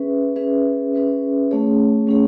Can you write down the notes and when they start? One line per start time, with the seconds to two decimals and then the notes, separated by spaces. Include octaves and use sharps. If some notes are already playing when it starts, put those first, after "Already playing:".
Already playing: C#4 G#4 B4 E5
0.36 C#4 G#4 B4 E5
0.93 C#4 G#4 B4 E5
1.51 A3 C#4 G#4 C#5
2.07 A3 C#4 G#4 C#5